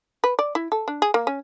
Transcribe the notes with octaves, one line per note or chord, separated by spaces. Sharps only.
B4
D5
E4
A4
D4
G#4
A#3
C#4